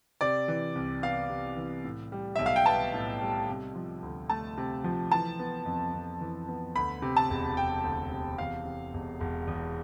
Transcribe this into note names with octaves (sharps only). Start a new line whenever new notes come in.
C3 D5
E3
C2
B3 F5
C3
E3
A2
G3
B1 E5
F5
G5
B3 A5
A2
G3
C3
F3
D2
A3 A5
C3
F3
E3 A5
B3
F2
F2
E3
B3
D2 B5
C3
A5
E1
E1 G5
D2
C3
E2 F5
C3
E1
E1
E2